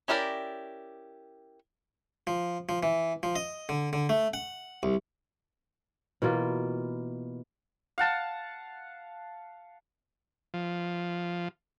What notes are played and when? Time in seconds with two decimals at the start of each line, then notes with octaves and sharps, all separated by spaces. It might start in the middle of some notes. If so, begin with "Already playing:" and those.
0.08 C#4 E4 G4 A#4 D5
2.27 F3
2.69 F3
2.83 E3
3.23 F3
3.36 D#5
3.69 D3
3.93 D3
4.09 A3
4.34 F#5
4.83 C2
6.22 B2 E3 A#3 F4
7.98 F5 F#5 A5
10.54 F3